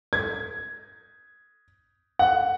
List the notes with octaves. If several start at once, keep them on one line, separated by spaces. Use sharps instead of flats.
G#6
F#5